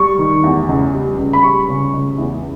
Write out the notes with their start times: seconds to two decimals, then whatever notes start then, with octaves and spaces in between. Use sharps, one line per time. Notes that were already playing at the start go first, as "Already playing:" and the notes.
Already playing: G3 C#6
0.18 D#3
0.44 E2
0.69 C#2
0.93 G3
1.19 C#2
1.33 B5
1.43 G3 C#6
1.68 C#3
1.93 C#2
2.18 E2